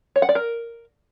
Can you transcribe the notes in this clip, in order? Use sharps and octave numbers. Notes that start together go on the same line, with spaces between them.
C#5
F#5
D5
A#4